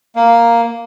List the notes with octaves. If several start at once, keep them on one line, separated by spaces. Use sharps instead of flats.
A#3